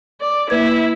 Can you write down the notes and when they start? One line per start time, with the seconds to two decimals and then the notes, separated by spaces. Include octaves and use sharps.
0.21 D5
0.50 A#3 E4 B4 G#6